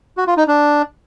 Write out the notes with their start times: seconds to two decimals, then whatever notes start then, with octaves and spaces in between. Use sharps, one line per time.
0.17 F#4
0.27 F4
0.37 D#4
0.48 D4